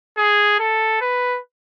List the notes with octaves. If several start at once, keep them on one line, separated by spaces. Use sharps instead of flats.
G#4
A4
B4